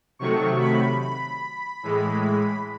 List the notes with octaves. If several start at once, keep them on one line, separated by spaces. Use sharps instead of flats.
C3 D#3 F#3 A3 C#6
B5
B5
A2 E3 G#3